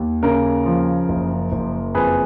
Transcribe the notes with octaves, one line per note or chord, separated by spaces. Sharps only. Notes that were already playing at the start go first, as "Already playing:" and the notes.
Already playing: D#2
C#3 A#4
F3
F#1
F#1
F2 G#4 B4